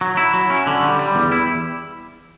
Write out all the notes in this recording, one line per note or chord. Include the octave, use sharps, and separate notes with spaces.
F#3
E4
F#3
C#4
D3
G3
G3
E2
E4